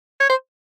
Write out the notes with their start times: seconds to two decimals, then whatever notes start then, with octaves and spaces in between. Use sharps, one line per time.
0.20 C#5
0.30 C5